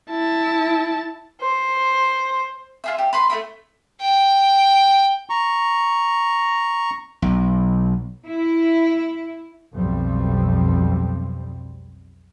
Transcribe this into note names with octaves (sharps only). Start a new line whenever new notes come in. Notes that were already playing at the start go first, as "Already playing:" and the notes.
E4 A5
C5
F4 G#4 E5
G4
B4 B5 C6
A3 C4 E4
G5
A#5 C#6
B1
E4
B1 F2 B2 G3 C4